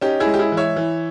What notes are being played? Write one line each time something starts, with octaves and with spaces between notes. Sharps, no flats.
C#4 D#4 G4
E4 G#4
G#3
G4
E4 G#4
E3
C#5 E5
E3